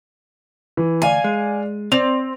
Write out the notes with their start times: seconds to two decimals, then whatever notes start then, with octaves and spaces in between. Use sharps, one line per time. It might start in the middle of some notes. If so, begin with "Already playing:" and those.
0.77 E3
1.02 D2 D5 F5 G#5 D#7
1.24 G#3
1.92 C4 D5 F7